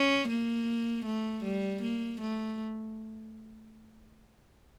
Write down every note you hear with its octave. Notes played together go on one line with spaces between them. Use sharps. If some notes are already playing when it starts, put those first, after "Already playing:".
Already playing: C#4
A#3
A3
G3
A#3
A3